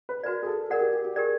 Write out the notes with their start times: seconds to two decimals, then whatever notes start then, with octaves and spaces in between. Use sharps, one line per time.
0.09 B4
0.23 F#4 A#4 B4 D5
0.43 G#4
0.47 A4
0.70 G#4 A#4 D5 F#5
0.81 G4
0.93 G4
1.05 G4
1.16 G4 G#4 A#4 D5